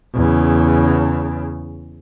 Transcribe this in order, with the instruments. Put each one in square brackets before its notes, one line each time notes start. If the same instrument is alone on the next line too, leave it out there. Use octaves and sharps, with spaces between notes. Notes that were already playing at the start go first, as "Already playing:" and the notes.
[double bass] E2 C#3